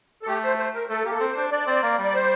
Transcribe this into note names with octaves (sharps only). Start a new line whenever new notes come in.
A4
A3 G4
C5
C5
A#4
A3 A4
A#3 G4
A4
C4
C5
D4
D4 D5
C4
A#3
G3
D5
C5